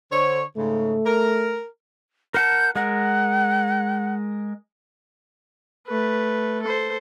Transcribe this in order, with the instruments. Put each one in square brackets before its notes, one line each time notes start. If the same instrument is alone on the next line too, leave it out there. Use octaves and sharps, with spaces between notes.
[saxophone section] D3 C#5 [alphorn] C5
[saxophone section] G#2 C#3 [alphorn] A3
[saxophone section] A#4
[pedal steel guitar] A#4 F#5 A5 [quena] G6
[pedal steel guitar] G#3 A#4 [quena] F#5
[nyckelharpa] A3 B4
A4 C5